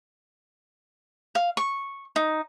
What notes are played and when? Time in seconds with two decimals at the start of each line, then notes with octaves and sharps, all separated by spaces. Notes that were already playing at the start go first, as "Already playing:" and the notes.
1.35 F5
1.57 C#6
2.16 D#4